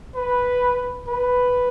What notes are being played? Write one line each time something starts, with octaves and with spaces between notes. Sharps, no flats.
B4
B4